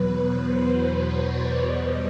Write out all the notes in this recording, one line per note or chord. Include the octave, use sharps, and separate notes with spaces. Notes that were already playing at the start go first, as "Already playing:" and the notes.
Already playing: E2 B2 F#3 B4
C5
C#5
D5
E2 B2 G3 D#5